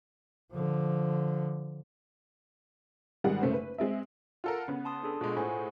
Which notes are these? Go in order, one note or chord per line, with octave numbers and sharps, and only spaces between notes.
D3 F3
G#1 G3 G#3 F#5
F#1 A3 C#4 C5
B4
G#3 C4 E5
F4 A4 A#4 F#5
C#3 B3
A5 C6 D#6
D4 G#4 A4
B2 G#3 F4
A2 G#4 C5 F#5 G#5